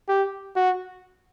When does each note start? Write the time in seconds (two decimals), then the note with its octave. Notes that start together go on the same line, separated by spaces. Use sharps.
0.09 G4
0.56 F#4